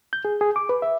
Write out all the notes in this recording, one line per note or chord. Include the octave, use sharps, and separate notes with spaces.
G6
G#4
G#4
D6
B4
E5